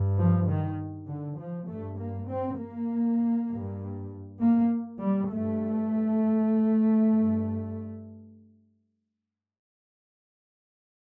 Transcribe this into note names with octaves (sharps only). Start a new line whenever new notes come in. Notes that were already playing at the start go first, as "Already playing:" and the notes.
Already playing: G2
F3
D#3
D3
F3
G2 A3
A#3
C4
A#3
G2
A#3
G3
G2 A3
G2